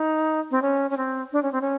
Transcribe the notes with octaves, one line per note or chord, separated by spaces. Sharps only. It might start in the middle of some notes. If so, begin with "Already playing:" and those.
Already playing: D#4
C4
C#4
C#4
C4
D4
C#4
C4
C#4